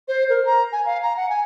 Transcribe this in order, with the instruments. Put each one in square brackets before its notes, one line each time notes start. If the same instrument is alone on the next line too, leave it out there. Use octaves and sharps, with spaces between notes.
[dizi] C5
A#4
A#5
G#5
F5
A#5
F#5
G#5